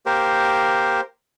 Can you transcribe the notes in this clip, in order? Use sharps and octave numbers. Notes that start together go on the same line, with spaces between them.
A#3 G4 A#4 C5